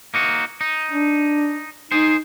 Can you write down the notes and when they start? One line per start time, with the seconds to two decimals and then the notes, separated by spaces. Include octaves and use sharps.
0.14 A#3 D#4 F#4
0.61 D#4
0.92 D4
1.91 D#4 G#4 C5